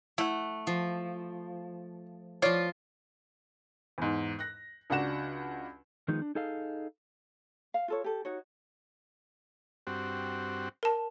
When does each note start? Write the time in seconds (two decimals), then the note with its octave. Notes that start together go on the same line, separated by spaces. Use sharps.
0.18 A3 E4 F#5
0.67 F3
2.42 F3 F4 C#5 D5
3.98 E2 G#2
4.39 F#6 A#6
4.90 C#2 D4 F#4 F#5 E7
6.08 D#3 F3 G#3 B3 D#4
6.22 D4
6.35 D#4 G#4 A4 D#5 F5
7.74 F5
7.88 F4 A4 C#5
8.04 G4 A4
8.25 D#4 F#4 C#5
9.87 G2 C4 F#4
10.83 A#4 A5